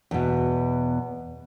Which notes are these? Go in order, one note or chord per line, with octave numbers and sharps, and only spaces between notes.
E2 B2